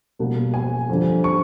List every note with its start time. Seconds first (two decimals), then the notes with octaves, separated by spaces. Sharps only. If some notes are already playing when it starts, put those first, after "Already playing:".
0.19 B2 G3 A#3
0.54 G#5
0.89 F2 D3 G3
1.24 C#6